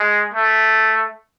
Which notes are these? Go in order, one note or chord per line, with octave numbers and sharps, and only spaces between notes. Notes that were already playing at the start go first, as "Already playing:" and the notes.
Already playing: G#3
A3